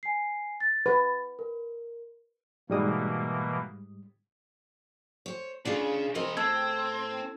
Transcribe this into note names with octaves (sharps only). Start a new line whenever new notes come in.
G#5 C7
A6
B4
A#4
G#2 B2 E3 G3 A#3 D#6
C5 C#5
C#3 D4 F4 G#4
E3 C4 A#4 B4 D#5
A2 C4 A5 E6 G#6